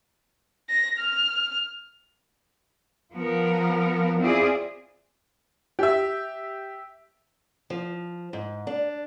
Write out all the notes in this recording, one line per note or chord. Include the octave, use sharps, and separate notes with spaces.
A#6
F6
F3 B3 A#4
C4 E4 F4 G#4 D5
G4 E5
F3
G#2
D4